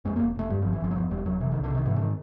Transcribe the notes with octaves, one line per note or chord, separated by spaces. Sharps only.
F2 G#3
A#3
F1
F1 A3
G2 G3
F3
G1
E3
G1 F3
F#3
E2 F3
F1 G3
F1 F#3
C3 E3
D#3
C2
D3
C3 D#3
G#2 E3
D3
D#3